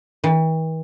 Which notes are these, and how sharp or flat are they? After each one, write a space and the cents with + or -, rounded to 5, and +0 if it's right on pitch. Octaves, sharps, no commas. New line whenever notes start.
E3 -45